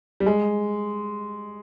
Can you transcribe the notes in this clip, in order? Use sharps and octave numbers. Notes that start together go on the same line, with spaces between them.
G3
G#3